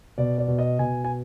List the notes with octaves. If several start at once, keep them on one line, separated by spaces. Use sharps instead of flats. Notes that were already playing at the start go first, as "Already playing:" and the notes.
B2 D5
D5
B2
D#5
B2 G#5
G#5